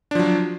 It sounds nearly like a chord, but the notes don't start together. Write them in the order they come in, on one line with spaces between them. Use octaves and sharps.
D4 F3 F#3